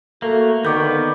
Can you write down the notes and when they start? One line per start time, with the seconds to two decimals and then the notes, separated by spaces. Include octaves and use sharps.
0.22 A3 A#3 F#4
0.65 D3 D#3 B3 C#6 D6 G6